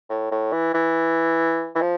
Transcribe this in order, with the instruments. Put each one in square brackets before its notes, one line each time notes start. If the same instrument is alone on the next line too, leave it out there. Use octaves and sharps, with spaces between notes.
[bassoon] A2
A2
E3
E3
E3
F3